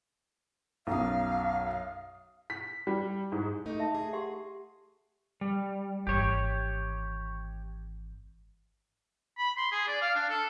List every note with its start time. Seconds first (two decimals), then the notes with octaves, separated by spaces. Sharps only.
0.87 B1 F#2 F5 D#6
2.50 B6
2.87 G3
3.32 G#2
3.66 A3 D#4 E4
3.80 E5 A5
3.95 G#4 D6
4.13 G4 F#5 C6
5.41 G3
6.07 G#1 E3 G4 C#5
9.38 B5
9.57 C6
9.72 G#4
9.88 D5
10.02 F5
10.15 D4
10.29 A4